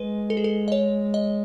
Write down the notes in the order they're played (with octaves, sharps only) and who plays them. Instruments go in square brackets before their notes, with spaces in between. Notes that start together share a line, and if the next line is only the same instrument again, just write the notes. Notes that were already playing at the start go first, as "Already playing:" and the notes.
Already playing: [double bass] G#3 [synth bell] B4
[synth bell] A4
G#4
A4
D#5
C#5
D#5